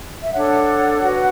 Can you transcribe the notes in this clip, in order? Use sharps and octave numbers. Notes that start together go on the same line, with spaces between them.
E5
D4 A4 C#5 F#5
F#4 B4